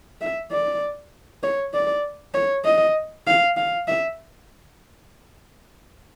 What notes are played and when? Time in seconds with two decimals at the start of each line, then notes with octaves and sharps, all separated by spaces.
0.21 E5
0.52 D5
1.43 C#5
1.74 D5
2.34 C#5
2.65 D#5
3.27 F5
3.57 F5
3.88 E5